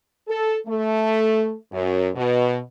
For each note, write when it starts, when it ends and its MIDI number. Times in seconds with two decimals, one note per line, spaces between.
0.28 0.56 69
0.67 1.53 57
1.71 2.08 42
2.15 2.58 47